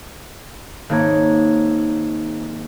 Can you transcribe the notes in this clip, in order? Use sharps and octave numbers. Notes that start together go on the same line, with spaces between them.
G#1 A#3 D#4 C#5 B5